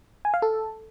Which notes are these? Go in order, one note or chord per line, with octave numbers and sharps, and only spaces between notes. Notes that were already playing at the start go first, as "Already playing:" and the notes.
G#5
F5
A4